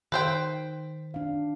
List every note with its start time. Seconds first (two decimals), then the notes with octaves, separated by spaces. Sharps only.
0.12 D#3 B4 C5 G5
1.14 D4 F5